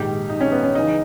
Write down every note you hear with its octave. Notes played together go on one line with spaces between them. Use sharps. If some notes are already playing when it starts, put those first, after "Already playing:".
Already playing: A#1 G#2 D#3 G4
D#4
C#4
B3
C#4
C#2 C#3 E3 D#4